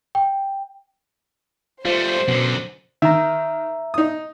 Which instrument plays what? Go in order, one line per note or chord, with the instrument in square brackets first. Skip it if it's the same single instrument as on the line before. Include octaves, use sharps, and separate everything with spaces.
[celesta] G5
[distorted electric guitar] G3 A3 [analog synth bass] F4 [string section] C5
[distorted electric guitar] F#2 D3 [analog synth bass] B2
[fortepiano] D#3 [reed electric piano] E5 A#5
[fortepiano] D#4 D#6